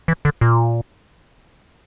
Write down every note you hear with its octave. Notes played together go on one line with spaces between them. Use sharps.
E3
D3
A#2